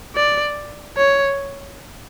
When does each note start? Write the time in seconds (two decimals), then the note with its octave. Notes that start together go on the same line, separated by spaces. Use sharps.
0.16 D5
0.97 C#5